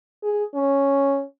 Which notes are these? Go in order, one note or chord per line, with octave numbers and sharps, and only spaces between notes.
G#4
C#4